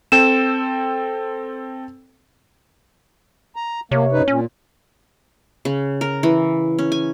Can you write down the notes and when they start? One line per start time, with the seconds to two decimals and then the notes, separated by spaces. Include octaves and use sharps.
0.12 C4 A4 G5 E7
3.56 A#5
3.91 C3 A#3 C#5
4.12 F#2 D#4 B4
4.28 A#2 C#4
5.65 C#3
6.01 A#4
6.23 E3
6.79 C#4
6.92 G#5